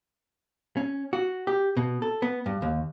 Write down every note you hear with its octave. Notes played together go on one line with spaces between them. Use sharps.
C#4
F#4
G4
B2
A4
B3
G2
D#2